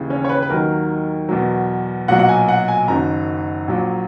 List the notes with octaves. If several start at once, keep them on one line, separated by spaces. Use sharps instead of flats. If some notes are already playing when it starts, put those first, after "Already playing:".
Already playing: D#2 C#3 E3
C#4
C#5
B4
B4
D#2 D#3 F#3 A#4
E2 B2 F#3
B1 A#2 F#3 F#5
F#5
G#5
F#5
G#5
F#1 F#2 D#3 A#5
A#1 A#2 F#3